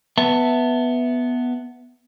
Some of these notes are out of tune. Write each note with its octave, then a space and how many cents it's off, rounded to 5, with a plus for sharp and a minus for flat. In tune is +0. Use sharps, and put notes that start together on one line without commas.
B3 +0 E5 +0 A5 +20